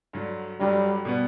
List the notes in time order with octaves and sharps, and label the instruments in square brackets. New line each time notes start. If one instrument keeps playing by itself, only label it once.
[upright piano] G2 D3 F#3
[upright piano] G2 D3 F#3 [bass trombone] G3
[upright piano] B2 G3 B3